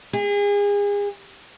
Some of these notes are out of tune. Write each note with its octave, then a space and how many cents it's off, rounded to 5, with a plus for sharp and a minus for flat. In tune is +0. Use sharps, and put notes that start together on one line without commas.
G#4 -35